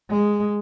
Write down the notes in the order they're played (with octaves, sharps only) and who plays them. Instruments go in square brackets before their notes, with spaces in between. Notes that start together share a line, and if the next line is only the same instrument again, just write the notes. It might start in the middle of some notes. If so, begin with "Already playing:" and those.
[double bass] G#3